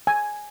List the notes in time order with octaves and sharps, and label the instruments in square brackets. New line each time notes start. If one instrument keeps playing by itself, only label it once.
[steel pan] G#5